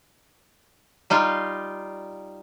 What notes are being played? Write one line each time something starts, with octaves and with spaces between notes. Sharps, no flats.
G3 D#4 F4